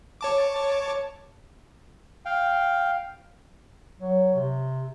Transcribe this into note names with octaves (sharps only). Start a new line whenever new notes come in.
C#5 A5 D6
F5 G5
F#3
C3